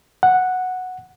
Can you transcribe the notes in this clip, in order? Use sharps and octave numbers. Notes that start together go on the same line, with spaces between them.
F#5